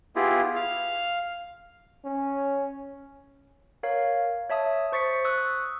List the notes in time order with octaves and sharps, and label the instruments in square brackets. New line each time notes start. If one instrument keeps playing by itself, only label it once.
[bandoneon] B3 E4 F4 G4 G#4
F5
[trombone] C#4
[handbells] A#4 C#5 F5
C#5 E5 A5 D#6
C5 C#6 A6 B6 C#7
C#6 D#6 E6 F#6